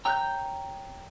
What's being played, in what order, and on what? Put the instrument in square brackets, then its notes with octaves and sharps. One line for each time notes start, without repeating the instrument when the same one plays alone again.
[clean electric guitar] C#5 G5 A#5 [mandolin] E6 F#6 G6